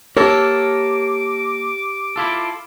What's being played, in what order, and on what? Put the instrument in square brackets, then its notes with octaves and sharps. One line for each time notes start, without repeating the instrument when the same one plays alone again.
[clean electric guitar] A#3 A4 [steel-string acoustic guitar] G4 [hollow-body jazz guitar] A#4 C#5 [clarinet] D6
[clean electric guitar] E4 F4 A4